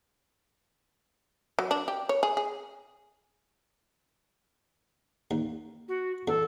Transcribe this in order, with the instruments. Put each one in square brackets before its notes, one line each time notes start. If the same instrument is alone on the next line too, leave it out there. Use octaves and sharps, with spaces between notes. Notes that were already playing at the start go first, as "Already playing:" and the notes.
[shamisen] F#3
D4
G4
C#5
G#4
G#4
[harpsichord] D#2
[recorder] F#4
[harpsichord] E2 [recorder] A4